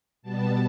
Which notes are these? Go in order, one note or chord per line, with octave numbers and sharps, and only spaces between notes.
B2 G3 B3 A5